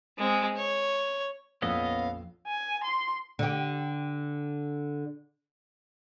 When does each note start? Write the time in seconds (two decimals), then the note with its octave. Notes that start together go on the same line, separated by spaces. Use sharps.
0.18 G#3 C4
0.56 C#5
1.62 A#1 F2 B3 C#4 D#5 F5 E6
2.47 G#5
2.83 C6
3.39 D3 G4